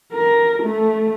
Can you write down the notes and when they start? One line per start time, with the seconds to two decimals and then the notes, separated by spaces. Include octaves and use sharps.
0.13 A#4
0.63 A3